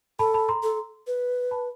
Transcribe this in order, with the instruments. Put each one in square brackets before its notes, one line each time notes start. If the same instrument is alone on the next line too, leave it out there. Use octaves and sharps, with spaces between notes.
[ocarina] A4 [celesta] A5 B5
[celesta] A5 B5
A#5 C6
[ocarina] A4
B4
[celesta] A5 B5